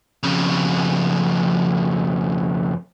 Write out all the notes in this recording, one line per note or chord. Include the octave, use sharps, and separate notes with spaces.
F2 C#3